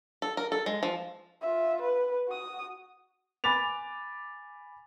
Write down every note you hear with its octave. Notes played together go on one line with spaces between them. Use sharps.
A4
A#4
A4
G#3
F3
F4 E5
B4
F#4 D#6
G#5 B5 D6 A6 F7